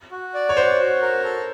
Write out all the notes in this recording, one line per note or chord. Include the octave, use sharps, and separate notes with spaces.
F#4
D5
C#5
F#4 C5
F#4
A#4
A4